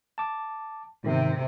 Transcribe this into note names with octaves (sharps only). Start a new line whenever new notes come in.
A5 D6
G#2 C3 D#3